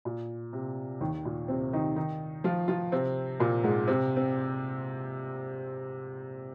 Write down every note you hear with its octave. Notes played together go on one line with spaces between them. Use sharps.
A#2
C3
D#2 D#3
A#2
C3 C4
D#3 D#4
D#3 D#4
F3 F4
F3 F4
C3 C4
A#2 A#3
G#2 G#3
C3 C4
C4